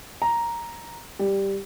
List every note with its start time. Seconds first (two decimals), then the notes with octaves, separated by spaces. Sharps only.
0.22 A#5
1.19 G3